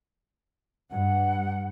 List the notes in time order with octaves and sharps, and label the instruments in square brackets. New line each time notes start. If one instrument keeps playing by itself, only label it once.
[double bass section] G2 [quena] F#5